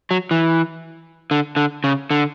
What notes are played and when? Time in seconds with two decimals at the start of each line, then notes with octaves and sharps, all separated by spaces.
0.11 F#3
0.31 E3
1.31 D3
1.56 D3
1.84 C#3
2.11 D3